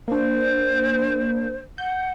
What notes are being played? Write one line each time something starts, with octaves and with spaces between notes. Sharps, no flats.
A#3 D4 C5
F#5 G6